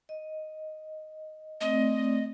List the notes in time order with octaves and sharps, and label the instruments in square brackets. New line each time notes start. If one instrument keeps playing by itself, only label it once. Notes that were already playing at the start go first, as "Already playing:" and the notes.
[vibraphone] D#5
[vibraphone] A3 C4 D5 [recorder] D#5